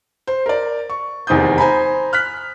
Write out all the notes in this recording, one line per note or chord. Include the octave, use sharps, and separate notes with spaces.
C5
A#4 D5
C#6
F1 E2 D#3 C5 D#6 G6
C5 G#5 A#5 B5
F6 F#6 B6